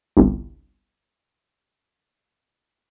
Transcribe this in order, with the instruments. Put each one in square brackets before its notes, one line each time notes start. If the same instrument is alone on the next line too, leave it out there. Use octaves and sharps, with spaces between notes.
[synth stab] G1 C2